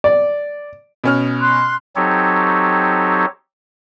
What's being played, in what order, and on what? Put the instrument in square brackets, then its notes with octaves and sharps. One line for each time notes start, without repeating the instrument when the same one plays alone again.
[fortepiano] D5
[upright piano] B2 C#4 F6
[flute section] C6 F#6
[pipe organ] F#3 C4 D#4 G4 A4 C#5